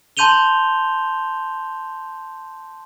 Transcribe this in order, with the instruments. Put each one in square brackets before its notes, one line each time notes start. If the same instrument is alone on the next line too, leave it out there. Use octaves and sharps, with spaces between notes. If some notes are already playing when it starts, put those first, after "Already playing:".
[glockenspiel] A5 C6 G6 D#7 F7 G7